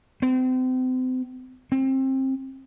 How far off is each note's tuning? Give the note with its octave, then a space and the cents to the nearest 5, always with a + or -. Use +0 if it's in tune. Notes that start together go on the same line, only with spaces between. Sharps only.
C4 -35
C4 +25